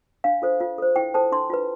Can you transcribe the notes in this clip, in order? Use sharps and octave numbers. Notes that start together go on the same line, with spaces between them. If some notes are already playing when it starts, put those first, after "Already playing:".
D4 F5
F4 A4 C5
F4
A4 C5
E4 G5
A4 C5 A5
D4 C6
F4 B4